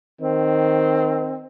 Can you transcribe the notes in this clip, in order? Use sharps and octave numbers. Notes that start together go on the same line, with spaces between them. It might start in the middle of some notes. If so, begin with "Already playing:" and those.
D#3 C4